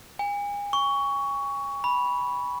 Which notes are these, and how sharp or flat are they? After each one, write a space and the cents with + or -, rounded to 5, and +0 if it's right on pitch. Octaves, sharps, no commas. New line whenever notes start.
G#5 -35
C#6 +15
B5 -10